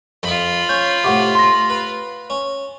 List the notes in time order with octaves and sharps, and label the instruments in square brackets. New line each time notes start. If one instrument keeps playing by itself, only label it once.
[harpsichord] F2 D#6 [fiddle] F4 B5
[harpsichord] C#4 [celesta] G6
[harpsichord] A2 C3 [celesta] F#5 C#6 D6
[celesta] C6 A#6
[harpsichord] B4
C#4